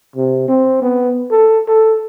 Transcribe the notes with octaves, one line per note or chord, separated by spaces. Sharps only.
C3
C4
B3
A4
A4